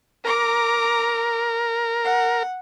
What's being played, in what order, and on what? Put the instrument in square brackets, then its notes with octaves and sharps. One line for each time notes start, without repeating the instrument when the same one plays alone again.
[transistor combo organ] A#4 [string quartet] A#5 D6
[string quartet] F#5